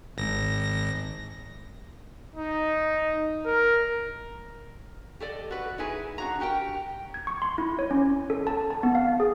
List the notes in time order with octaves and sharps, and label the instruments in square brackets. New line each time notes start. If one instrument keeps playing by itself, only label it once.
[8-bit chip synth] G#1 A#6
[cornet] D#4
A#4
[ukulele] G4 A4 D5 D#5
F#4 B4
D#4 E4 G#4 B4
D4 F#4 A#5
F#4 G4 A#4 G5
[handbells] G#6
C#6
C6
E4
C#5
C#4
A4
A5
A5
B3
F5
G#4